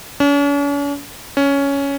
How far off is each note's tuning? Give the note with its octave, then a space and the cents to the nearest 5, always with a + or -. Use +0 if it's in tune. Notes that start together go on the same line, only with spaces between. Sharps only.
C#4 +45
C#4 +10